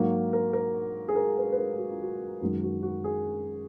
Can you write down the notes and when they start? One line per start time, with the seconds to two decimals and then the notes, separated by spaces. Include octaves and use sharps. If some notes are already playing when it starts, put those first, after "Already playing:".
Already playing: G#2 F#3 A#3 F#4
0.33 A#4
0.53 A#4
1.08 G#4
1.16 A#4
1.38 B4
1.52 B4
1.58 A#4
1.78 F#4
1.91 F4
2.02 F#4
2.41 F#2 D#3 G#3 F#4
2.63 F#4
2.83 F#4
3.04 G#4